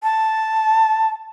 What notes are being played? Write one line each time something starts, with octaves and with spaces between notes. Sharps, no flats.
A5